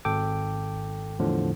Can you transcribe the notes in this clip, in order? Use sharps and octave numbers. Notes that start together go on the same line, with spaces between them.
G#1 A4 G5 D6
E2 A2 D3 F3